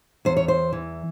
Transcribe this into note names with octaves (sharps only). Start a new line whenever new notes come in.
E2 C5
C#5
C5
E3